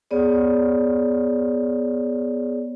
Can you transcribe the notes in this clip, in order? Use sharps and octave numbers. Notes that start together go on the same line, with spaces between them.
B3 G#4 C#5 D5